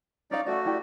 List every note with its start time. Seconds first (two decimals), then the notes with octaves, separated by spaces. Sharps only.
0.31 C#4 D#4 D5 F5
0.47 A3 F#4 D5 E5
0.66 E4 G4 D5